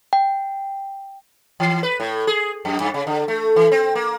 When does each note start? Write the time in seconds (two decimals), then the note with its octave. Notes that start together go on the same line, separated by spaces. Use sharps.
0.13 G5
1.60 E3
1.83 B4
2.00 A2
2.27 G#4
2.65 F#2
2.80 G2
2.94 C#3
3.07 D3
3.28 A3
3.56 E3
3.72 C4
3.95 A#3